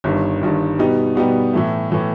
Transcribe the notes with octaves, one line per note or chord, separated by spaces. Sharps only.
G1 G2 D#3 G3
G1 G2 D#3 G3
B2 G3 B3 D#4 G4
B2 G3 B3 D#4 G4
A2 E3 A3
A2 E3 A3